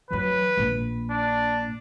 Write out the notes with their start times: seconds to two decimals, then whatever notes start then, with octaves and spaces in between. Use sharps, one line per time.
0.11 E3 F#3 B4
0.57 A#1 A#2
1.10 D4